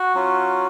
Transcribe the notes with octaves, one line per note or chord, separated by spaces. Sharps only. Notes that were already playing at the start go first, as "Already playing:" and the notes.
Already playing: F#4
F#3 C#4 F4